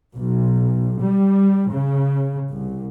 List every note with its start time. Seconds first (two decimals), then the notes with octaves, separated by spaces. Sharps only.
0.15 B1
1.00 G3
1.70 C#3
2.49 C2